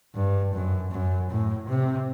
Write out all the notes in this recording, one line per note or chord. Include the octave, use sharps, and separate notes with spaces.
G2
F#2
F#2
A2
C3